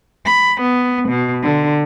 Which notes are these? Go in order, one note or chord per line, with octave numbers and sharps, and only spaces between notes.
B5
B3
B2
D3